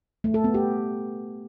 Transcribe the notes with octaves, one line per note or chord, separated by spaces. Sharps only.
A3
A4
B3
G4